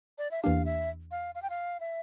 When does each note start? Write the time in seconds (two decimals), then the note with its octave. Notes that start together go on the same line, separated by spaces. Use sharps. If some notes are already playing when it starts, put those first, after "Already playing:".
0.18 D5
0.31 E5
0.43 E2 E3 A#3 D4 G4 F5
0.65 E5
1.11 F5
1.35 F5
1.42 G5
1.50 F5
1.80 E5